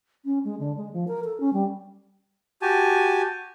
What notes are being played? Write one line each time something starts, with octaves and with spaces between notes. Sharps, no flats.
C#4
G#3
D3
G#3
F3
A#4
A4
C#4
G3
F#4 G4 G#5 A5